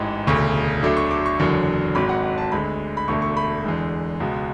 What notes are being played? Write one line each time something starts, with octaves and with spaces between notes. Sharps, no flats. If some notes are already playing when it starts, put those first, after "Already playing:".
Already playing: A1 G#2 E3
E1 D2 C#3 C#6
D2 D3 F#3 A3 D6
C#6
D6
C#6
F#1 E2 D3 F#3
G#1 G#2 F#3 B5
F#5
F#5
A5
D2 D3 G#3 B5
B5
E1 D2 D3 A3 C#6
C#6
B5
E2 D3 G#3
C#2 B2 G#3